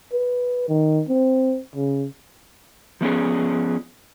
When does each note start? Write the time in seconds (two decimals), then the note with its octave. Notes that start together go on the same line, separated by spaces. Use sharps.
0.13 B4
0.69 D#3
1.09 C4
1.76 C#3
3.01 F3 B3 C#4 G#4